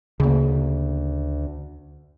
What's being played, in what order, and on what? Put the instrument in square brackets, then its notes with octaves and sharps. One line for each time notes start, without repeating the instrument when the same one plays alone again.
[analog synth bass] D2 [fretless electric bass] C#3 A#3